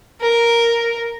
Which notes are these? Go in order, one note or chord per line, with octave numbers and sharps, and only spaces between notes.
A#4